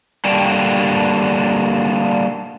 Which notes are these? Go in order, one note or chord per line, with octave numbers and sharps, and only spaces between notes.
D3 G3 A#3 D4 F#4 G5